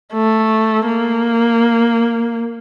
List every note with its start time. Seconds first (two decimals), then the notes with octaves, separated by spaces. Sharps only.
0.14 A3
0.87 A#3